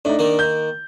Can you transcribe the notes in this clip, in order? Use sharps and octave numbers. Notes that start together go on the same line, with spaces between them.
A2 D4 D#4
D#3 A#3
G6